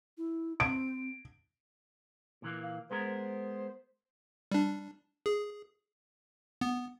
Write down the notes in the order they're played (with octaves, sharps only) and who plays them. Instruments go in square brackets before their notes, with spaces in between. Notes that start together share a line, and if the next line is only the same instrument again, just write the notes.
[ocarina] E4
[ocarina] C4 [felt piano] D7
[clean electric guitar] A#2 E3 A#3
[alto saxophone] F5
[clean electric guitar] G#3 B3 A#4 [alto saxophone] C5
[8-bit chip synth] G3 D4
G#4
B3